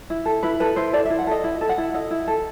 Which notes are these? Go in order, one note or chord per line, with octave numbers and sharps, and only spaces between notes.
E4
A4
E4 B4
A4 B4
E4 C5
A4 D5
E4 E5
F#5
A4 D#5
E4
A4
F#5
E4
A4 D#5
E4
A4